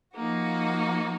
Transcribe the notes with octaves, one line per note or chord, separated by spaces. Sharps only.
F3 A#3 D#4 F#4